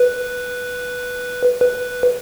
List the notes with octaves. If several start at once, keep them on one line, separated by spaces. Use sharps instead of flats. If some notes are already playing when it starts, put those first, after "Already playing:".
Already playing: B4
B4